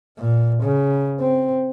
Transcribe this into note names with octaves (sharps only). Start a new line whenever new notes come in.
A#2
C#3
C4